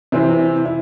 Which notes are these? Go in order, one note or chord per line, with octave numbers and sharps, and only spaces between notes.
C3 E3 C4 E4
E4